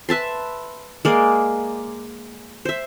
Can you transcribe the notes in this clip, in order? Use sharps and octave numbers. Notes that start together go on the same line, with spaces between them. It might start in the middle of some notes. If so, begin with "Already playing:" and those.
B4 E5 A5 C6
G#3 A#3 D5
C5 E5